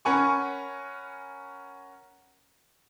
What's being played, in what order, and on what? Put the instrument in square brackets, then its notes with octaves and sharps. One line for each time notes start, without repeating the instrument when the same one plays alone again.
[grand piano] C#4 A#4 F#5 G#5 B5 C#6